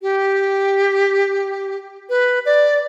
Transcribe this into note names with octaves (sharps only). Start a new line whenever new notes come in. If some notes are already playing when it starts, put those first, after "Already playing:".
G4
B4
D5